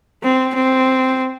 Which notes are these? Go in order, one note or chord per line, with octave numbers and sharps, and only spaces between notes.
C4
C4